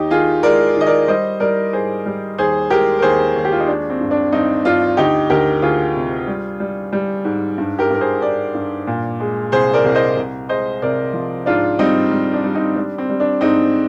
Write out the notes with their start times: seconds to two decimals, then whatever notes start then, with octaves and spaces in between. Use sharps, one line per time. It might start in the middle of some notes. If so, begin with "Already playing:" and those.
Already playing: D#2 D#4 G4
0.11 D#3 F4 G#4
0.43 G#3 A#4 D5
0.76 D#3
0.81 D#5
0.86 A#4 D5
1.08 G3 C5 D#5
1.40 G3 A#4 D5
1.73 G#2 G#4 C5
2.06 G3
2.38 D#2 G#4 C5
2.70 G#3 G4 A#4
2.98 A#4
3.02 D#2 G#4 C5
3.36 D#2
3.45 G4
3.52 F4
3.60 D#4
3.67 G#3 D4
3.90 C4
4.00 G2
4.11 D4
4.32 G2 C4 D#4
4.65 G2 D4 F4
4.97 D2 D#4 G4
5.30 D2 G4 A#4
5.62 D2 F4 G#4
5.95 C3
6.27 G3
6.60 G3
6.93 G3
7.25 G#2
7.58 G2
7.78 G4 A#4
7.90 G2 A#4
8.01 G#4 C5
8.22 G2 A#4 D5
8.54 G2
8.87 A#2
9.20 G#3
9.52 C2 G#4 C5
9.73 A#4 D5
9.84 C2
9.95 C5 D#5
10.17 C2
10.49 G#3 C5 D#5
10.82 C3 A#4 D5
11.14 F3
11.46 G#2 D4 F4
11.79 G3 C4 D#4
12.11 G3
12.33 D4
12.44 G3
12.54 C4 D#4
12.76 G3 D4
12.98 C4
13.09 G3
13.20 D4
13.41 G#2 C4 D#4